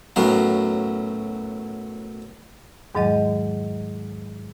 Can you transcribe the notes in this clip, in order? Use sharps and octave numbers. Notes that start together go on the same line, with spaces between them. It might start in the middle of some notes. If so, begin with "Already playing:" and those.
F#2 A2 F#3 B3 F5
E2 G#2 D#3 F#3 G#3 D#5